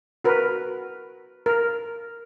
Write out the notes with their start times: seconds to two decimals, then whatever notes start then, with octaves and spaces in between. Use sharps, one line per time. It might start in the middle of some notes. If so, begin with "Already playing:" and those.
0.24 F#4 A#4 B4
1.46 A#4